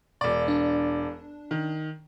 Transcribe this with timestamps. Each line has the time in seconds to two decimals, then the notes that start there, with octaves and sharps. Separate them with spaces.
0.21 E1 D5
0.48 D4
1.51 D#3